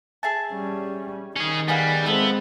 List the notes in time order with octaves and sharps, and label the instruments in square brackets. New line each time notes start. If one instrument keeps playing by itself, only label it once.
[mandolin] G#4 E5 A5
[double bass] G3 C#4
[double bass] D#3 [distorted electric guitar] C#4 G#4
[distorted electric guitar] G3 [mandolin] B3 G#4 F5
[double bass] G#3 C4 [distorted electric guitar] B3 [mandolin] E4 A4